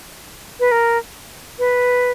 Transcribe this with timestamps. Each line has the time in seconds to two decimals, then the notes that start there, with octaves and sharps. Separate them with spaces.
0.60 B4
0.72 A#4
1.59 B4